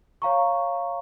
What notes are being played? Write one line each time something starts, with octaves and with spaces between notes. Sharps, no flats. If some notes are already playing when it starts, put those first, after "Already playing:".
C#5 F5 A#5 C#6